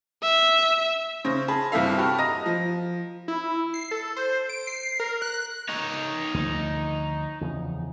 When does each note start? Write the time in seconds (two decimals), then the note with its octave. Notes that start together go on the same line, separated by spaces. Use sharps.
0.23 E5
1.25 C#3 C5 A#6
1.48 G#4 A5 B5
1.72 G1 C3 E4 A4 E5 F5
1.98 F#4 G4 A5 B5 F6
2.19 D#5 A#5 D#6 A#6
2.46 F3
3.28 E4
3.74 C7
3.91 A4
4.16 C5
4.49 D7
4.67 C7
5.00 A#4
5.22 F#6
5.69 D#4 C#5
6.34 D2 F3
7.41 E2 C#3 F3